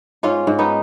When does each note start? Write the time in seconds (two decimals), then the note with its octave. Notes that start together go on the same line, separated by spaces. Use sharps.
0.23 G#2 C#4 F4
0.47 G#2
0.59 B3 D#4